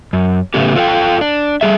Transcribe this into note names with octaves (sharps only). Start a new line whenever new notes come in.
F#2
A2 C#3 A3 B3 C#4 G4
F4 A4 A#4 F5 G5
D4
G3 G#4 E5